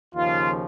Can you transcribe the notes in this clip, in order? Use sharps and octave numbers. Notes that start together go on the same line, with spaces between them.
D#2 C#3 F3 F4